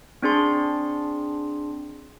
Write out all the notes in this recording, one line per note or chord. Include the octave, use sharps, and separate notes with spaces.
C4 D4 G#4 C6